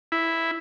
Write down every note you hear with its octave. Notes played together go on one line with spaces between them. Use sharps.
E4